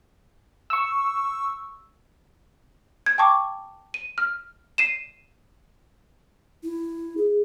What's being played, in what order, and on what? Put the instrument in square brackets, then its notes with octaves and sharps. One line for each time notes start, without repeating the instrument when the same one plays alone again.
[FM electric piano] C#6 E6
[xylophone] G#6
G5 A5 C#6 D6
D#7
F6
C7 D#7 E7
[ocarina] E4
G#4